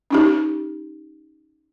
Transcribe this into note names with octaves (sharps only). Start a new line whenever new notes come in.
C#4 D#4 G4